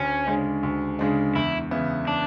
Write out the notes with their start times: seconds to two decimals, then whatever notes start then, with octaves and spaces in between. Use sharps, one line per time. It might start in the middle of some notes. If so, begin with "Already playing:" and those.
Already playing: D2 C#4
0.26 C#3 G#3 D4
0.63 D2
0.99 C#3 G#3 D4
1.35 E2 E4
1.71 C#3 E3 B3 E4
2.07 D4